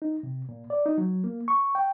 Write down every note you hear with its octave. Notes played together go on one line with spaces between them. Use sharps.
D#4
C3
A#2
D5
D#4
F#3
A#3
C#6
G5